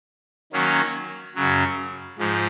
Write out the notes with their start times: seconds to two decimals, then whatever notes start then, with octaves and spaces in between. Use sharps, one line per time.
0.52 D#3 F#3 A#3 C#4
1.35 F#2 C#3 F#3
2.18 G#2 F3